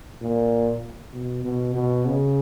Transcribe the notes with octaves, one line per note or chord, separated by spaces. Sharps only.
A#2
B2
B2
B2
C#3